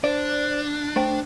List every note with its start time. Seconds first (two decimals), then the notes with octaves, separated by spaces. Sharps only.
0.04 D4 C5 D5
0.96 A3 C5 G5